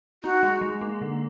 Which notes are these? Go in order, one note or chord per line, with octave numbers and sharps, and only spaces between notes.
D#4 F#4
G#3
G#3
A#3
D3